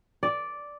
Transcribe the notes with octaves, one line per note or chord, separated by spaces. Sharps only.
D5